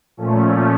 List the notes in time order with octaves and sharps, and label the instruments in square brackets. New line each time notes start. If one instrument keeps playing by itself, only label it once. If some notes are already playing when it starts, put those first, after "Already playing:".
[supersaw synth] A#2 F3 A3 C#4